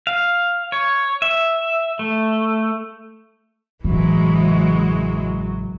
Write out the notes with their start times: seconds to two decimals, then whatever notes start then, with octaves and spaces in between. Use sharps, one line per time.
0.07 F5
0.72 C#5
1.22 E5
1.99 A3
3.84 A1 F#2 C#3 E3 F#3 G#3